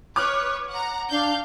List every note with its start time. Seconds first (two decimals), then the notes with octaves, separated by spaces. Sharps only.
0.16 B4 C#5 D6 F6 F#6
0.71 F#5 A#5
1.09 D4 F5 G6